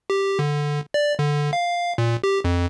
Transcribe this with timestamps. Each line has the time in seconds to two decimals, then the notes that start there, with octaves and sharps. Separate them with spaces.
0.10 G4
0.39 D3
0.94 D5
1.19 D3
1.53 F5
1.98 A#2
2.24 G4
2.44 F2